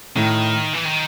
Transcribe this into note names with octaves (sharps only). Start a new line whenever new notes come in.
A2 D#3
E3
D#3